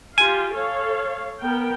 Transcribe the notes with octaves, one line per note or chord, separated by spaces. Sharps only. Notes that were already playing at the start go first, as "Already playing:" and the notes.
F4 G4 G#5
A4 C#5 F5
B3 A#4 G5